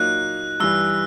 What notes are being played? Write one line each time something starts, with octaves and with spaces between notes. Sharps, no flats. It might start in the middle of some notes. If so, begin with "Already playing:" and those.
Already playing: A#2 F#3 A#3 D#4 F#6
G2 E3 G3 E6